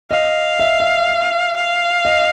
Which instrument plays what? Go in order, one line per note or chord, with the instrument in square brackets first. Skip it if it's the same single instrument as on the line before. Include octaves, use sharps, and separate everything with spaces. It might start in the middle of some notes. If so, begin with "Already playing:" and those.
[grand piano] D#5 [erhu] F5
[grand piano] E5
E5
[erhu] F5
[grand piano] D#5